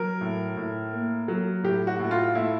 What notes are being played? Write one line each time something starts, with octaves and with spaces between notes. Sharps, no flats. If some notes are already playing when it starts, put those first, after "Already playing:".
Already playing: F#3 A#4
A2
A2
A#3
F#3
A2 G4
F#4
A2
F4
A3 E4